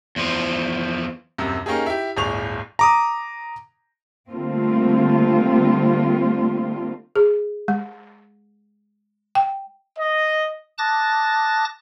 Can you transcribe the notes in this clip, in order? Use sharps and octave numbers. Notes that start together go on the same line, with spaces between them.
E2 F3
D#1 F#2 C3
A#3 C#4 D#4 G4 G#4
E4 G4
D1 G1 G#4 D5 C#6 F7
A#5 D6 D#6
D3 G3 A3 A#3 C4 F4
G#4
G#3
G5
D#5
A5 D6 D#6 F#6 A6 A#6